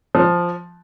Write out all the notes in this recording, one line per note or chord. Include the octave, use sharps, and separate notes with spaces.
F3